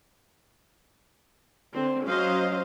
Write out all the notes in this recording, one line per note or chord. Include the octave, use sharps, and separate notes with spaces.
D3 C4
F#3 C#4 C5 D#5 F5